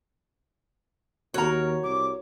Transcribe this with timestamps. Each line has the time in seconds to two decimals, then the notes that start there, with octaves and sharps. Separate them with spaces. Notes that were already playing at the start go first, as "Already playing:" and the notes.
1.34 D#2 F#4 A#4 C#5 A#5
1.83 C2 D6